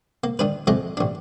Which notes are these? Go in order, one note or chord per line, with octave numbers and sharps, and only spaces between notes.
A#3
D#3 D4 B4
F2 G#3 A3 D#5 D6
A1 D4